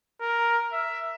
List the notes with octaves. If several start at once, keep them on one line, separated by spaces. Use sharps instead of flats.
A#4
E5